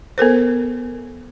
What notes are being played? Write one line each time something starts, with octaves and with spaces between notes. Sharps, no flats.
B3 A4 A#4 C5